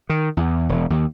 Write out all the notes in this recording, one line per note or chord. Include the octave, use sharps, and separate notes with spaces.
D#3
E2
E1
D#2